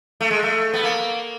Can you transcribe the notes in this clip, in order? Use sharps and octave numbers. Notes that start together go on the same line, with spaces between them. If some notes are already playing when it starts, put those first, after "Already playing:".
A3
G#3
A3
B3
A#3